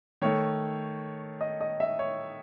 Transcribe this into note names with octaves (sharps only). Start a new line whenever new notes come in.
D#3 A3 C#5
D#5
D#5
E5
C#5